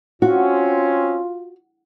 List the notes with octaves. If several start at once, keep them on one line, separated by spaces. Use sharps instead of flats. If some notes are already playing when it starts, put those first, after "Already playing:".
C4 C#4 F4 F#4